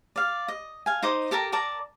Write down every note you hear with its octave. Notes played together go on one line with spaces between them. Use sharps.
D5 F5
D#5
F5 G#5
D#4 C5 D#5 D6
G4 A4 A#4 A#5
A#4 D5 A5 A#5